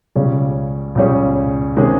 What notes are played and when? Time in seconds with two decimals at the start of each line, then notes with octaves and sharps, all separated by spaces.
0.16 C#2 C#3 G3 C#4 G#4
0.95 C#2 C#3 G3 C#4 G#4
1.76 C3 D#3 G#3 C#4 G#4